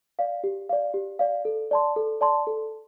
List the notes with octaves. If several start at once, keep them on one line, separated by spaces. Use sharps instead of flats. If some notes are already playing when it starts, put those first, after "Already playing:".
D5 F5
G4
D5 F5
G4
D5 F5
A4
D5 A5 C6
A4
D5 A5 C6
A4